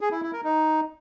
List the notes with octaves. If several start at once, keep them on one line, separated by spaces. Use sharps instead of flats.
G#4
E4
E4
A#4
D#4